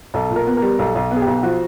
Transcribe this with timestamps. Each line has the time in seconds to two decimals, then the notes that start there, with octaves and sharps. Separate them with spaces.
0.14 B1 A4
0.30 A#2
0.36 A#4
0.47 B3
0.57 A#4
0.62 G3
0.79 B1 A4
0.95 B1
1.11 B3
1.17 G#4
1.22 G4
1.27 B1
1.43 F3 F#4